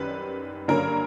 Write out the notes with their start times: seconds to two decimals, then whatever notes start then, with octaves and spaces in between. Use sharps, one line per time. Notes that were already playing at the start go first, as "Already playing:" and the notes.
Already playing: F#2 D#3 G3 B4
0.68 G2 D3 F#3 A#3 C#4 A#4